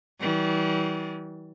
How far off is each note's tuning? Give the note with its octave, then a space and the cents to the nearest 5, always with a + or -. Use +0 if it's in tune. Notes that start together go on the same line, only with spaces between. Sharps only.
E3 -35 G3 -40